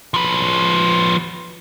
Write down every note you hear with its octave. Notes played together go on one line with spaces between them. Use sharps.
F3 B4